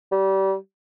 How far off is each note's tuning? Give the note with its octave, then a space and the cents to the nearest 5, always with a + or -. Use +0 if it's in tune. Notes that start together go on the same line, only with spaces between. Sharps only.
G3 -25